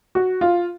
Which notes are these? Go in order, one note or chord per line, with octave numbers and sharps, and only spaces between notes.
F#4
F4